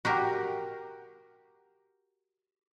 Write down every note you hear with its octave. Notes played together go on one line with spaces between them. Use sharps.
F#4 G4 A#4